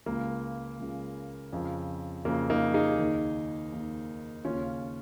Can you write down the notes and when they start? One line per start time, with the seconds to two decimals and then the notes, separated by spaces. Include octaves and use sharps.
0.06 C#2 C#3 A#3
0.79 C#2 C#3
1.53 F2 C#3
2.25 F2 C#3 A#3
2.50 A#3 D#4
2.74 D#4 G#4
2.98 D#2 D#3
3.72 D#2 D#3
4.44 D#2 C#3 C#4 F4